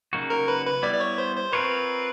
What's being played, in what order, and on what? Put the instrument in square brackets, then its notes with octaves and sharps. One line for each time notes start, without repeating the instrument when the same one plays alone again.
[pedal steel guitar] C#3 F#3 A#3 D#4 F#4
[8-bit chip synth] A#4
B4
B4
[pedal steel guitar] G3 B3 E4 [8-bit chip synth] D5
[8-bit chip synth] D5
C#5
C5
C5
[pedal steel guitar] C4 F4 A#4 C#5 [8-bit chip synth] B4